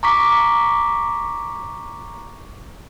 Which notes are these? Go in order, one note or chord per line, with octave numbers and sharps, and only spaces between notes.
A#5 C#6 D6 B6